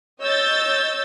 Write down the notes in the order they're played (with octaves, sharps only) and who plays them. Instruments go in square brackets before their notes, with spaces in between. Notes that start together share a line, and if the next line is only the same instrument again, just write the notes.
[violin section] C#5 D#5 E6 G6 A6